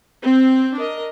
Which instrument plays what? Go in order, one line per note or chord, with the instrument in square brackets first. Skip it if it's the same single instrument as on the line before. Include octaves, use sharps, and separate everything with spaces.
[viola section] C4
D4 A#4 D#5